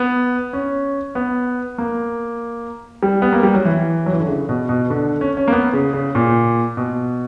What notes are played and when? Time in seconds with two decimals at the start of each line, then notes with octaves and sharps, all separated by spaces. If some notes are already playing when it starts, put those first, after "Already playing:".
Already playing: B3
0.53 C#4
1.15 B3
1.78 A#3
3.03 G3
3.22 B3
3.33 A#3
3.43 G3
3.54 F#3
3.65 E3
4.06 F#3
4.13 E3
4.20 D3
4.27 C#3
4.49 B2
4.69 B2
4.90 D3
5.21 C#4
5.37 C#4
5.48 A#3
5.52 B3
5.73 C#3
5.94 C#3
6.15 A#2
6.77 B2